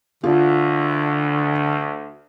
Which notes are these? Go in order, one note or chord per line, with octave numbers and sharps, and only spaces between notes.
D2 D3 F4